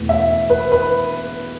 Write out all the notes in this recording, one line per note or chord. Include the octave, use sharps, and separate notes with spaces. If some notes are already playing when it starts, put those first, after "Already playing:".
Already playing: E2 B2 A3
E5
B4
B4